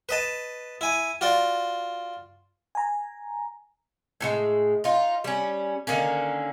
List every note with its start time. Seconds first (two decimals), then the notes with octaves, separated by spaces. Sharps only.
0.09 B4 D#5 A5
0.81 E4 G#5
1.21 F4 F#4 D5
2.75 G#5 A#5
4.21 A2 E3 G#3
4.84 D#4 F4
5.24 G3 C#4
5.87 D3 D#3 A#3 C#4